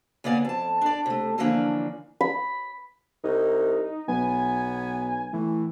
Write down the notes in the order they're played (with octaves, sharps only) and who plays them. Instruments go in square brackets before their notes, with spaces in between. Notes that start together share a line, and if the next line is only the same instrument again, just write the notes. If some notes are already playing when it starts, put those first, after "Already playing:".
[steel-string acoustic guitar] C#3 A#3 B3 D5 G#5
F2 A5
D4 D5
C3 A3
D3 E3 F3 A#3 C#4 D4
[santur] B5
[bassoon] C2 [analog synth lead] D#4
[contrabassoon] B1 [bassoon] B3 [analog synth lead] G#5
[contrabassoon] A2 [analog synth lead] E3